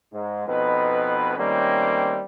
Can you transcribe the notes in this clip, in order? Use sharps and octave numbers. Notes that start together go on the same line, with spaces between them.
G#2
F2 B2 D#4 B4
D#3 G3 A3 A#3 C4 C#4